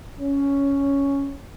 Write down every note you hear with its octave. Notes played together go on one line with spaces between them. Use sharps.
C#4